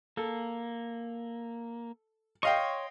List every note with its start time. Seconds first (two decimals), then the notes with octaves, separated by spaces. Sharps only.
0.17 A#3 A4
2.43 C#5 D#5 F5 G5 C6 C#6